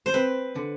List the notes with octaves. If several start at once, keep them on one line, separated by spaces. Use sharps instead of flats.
C5
C4 B4
D3